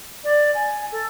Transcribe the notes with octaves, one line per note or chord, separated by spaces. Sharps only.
D5
G#5
A4